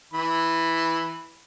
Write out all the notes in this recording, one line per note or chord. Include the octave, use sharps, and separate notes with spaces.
E3 B5